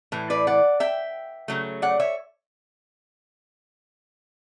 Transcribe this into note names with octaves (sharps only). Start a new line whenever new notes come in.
A2 E3
B4 D5
D5 F#5
E5 G5
C#3 F#3 A3
D5 F#5
C#5 E5